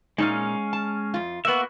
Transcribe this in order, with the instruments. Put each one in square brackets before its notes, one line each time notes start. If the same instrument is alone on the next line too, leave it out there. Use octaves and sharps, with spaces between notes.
[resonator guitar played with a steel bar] A#2 C#3 D#4 [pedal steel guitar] G#3 C#4 F5
[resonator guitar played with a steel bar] A5
F2 F4
[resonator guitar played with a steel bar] A#3 B3 [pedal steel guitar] F#4 E5